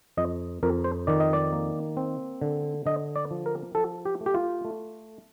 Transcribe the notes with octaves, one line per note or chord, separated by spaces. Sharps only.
F2 D#5
F2 A#4
C5
D#3 D5
D#5
D5
A#3
C4
D3
D3 D#5
D5
F3
A#4
F3 A4
G4
A3
G4
F4
A3